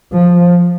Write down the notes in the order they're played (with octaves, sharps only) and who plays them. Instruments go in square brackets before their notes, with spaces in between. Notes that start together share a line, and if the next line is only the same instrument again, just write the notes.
[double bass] F3